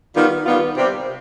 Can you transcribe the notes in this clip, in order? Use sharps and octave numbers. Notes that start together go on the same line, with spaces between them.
D#3 G3 B3 F4
D#3 G3 B3 F4
C3 G3 C4 G4